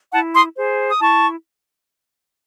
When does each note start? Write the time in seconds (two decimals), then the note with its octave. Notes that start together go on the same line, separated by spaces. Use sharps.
0.12 E4 F#5 A5
0.34 C6 D#6
0.56 G#4 C5
0.89 D#6
1.00 E4 A5 C#6